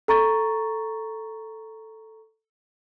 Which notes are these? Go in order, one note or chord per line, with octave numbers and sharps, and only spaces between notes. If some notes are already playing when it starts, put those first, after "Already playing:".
A4 A#5 C#6 A6